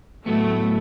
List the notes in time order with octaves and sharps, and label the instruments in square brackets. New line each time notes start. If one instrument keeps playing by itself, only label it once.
[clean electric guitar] A2 F#3 B3 [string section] A3